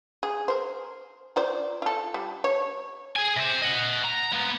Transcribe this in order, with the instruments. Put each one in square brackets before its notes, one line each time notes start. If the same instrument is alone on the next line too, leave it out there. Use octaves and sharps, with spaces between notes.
[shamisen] G#4
A#4 C5
F4 C5 D5
F4 A4
G3
C#5
[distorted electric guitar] G#4 G#5
C3 C5
D#5 F#5
A#5
A#3 B3